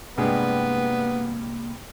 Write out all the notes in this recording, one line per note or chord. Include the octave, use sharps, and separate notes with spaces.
C2 G2 G#3 A#3 B3